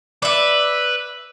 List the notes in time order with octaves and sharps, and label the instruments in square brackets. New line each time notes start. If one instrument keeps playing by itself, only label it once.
[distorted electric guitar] B4 [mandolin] D5 E5